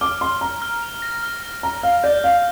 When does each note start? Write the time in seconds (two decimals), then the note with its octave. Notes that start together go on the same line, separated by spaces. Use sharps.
0.01 D6 F6
0.21 C6 F6
0.41 A#5 F6
0.62 F6
0.82 F7
1.02 A#6
1.23 F6
1.43 F6
1.63 A#5 F6
1.83 F5 F6
2.03 D5 G6
2.24 F5 G6